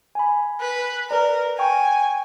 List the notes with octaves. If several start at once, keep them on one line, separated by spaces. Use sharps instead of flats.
G#5 B5
B4
A#4 B4 D5
G5 G#5 C#6